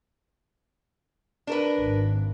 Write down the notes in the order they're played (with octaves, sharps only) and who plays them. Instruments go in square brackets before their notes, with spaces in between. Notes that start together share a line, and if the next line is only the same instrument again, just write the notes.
[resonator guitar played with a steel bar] D4 A#4 B4
[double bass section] G#1